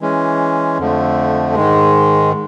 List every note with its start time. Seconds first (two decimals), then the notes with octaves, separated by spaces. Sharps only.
0.01 E3 G#3 C#4
0.78 F2 D3 F3 A3
1.55 G#2 D#3 G#3